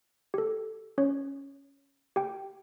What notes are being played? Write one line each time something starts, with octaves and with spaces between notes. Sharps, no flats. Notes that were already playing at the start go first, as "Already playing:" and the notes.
G4
A4
C#4 C#5
G4 G5